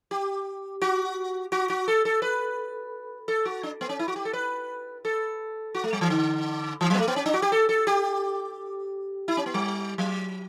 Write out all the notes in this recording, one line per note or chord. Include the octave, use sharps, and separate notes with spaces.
G4
F#4
F#4
F#4
A4
A4
B4
A4
F#4
D4
B3
C#4
E4
F#4
G4
A4
B4
A4
F#4
A3
G3
E3
D3
E3
F#3
B3
A3
B3
C#4
D4
F#4
G4
A4
A4
G4
E4
C#4
B3
G3
F#3